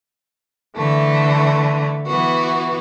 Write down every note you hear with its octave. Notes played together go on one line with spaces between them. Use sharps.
D3 E3 A3
E3 B3 F#4